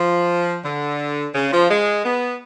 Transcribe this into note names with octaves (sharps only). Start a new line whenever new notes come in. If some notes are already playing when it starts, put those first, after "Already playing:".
Already playing: F3
D3
C#3
F3
G#3
B3